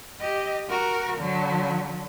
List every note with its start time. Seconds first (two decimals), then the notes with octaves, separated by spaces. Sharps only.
0.20 G4 D#5
0.69 F#4 A#4
1.18 D3 F#3